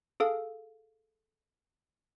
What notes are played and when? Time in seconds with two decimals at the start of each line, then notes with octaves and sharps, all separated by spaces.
0.20 G#4 A4 F5